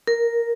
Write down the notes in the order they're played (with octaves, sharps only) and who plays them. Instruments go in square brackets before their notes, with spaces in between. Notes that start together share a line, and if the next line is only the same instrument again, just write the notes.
[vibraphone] A#4